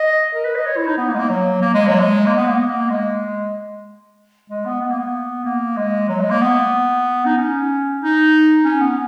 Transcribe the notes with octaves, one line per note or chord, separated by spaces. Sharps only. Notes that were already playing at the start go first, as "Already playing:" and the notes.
Already playing: D#5
A#4
B4
D#5
C#5
E4
D#4
B3
A#3
G#3
A#3
F#3
A#3
G#3
F#3
G#3
A#3
B3
A#3
B3
A#3
G#3
G#3
B3
B3
A#3
B3
A#3
G#3
F#3
G#3
A#3
B3
D#4
C#4
D#4
C#4
B3